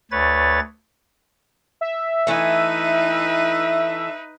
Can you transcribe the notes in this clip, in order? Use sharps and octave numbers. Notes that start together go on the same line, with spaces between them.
D2 B4 C#5 A6
E5
E3 A3 D#4 B4